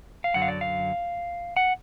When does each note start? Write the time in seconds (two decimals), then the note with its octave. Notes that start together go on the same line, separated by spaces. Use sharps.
0.24 F5
0.34 F#2 D3 F#3 F#5
0.42 F5
0.48 D5
0.61 F5
1.57 F#5